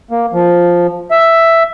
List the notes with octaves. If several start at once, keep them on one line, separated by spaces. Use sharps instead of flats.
A#3
F3
E5